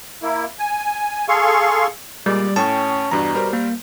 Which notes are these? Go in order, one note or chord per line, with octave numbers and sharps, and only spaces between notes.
A#3 E4
G#5
G#4 A4 F5 C6 C#6
A#2 G3 G#3 A#3 D5
A2 C#4 G5 A5 C#6
E2 G2 B2 D4 A#5
G3 A#4 C5
A#3